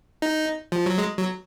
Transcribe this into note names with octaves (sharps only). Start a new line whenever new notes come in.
D#4
F3
F#3
G#3
F#3